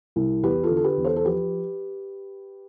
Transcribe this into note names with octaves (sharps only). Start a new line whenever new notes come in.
C2
E2 G4 B4
F4 A4
D3
A4
G4 B4
E2
A4 C5
A4
F3 G4 B4